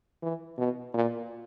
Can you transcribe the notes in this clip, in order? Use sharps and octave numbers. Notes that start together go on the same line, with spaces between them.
E3
B2
A#2